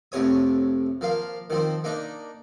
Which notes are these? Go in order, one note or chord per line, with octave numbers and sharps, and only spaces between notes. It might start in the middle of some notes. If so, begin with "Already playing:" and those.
F2 A2 C3 C#5 D#6
F3 A#3 F5
D#3 F3 C4
A#3 D4 D#4